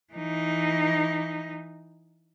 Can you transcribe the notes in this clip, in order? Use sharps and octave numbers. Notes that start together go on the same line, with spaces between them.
E3 D#4